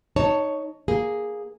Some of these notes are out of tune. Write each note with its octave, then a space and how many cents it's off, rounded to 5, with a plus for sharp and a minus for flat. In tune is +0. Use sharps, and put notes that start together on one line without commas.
D#4 +0 C#5 +10 A5 +15
A#3 +5 G#4 +0